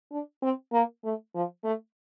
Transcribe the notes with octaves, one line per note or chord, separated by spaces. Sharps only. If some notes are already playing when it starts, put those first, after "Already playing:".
D4
C4
A#3
A3
F3
A3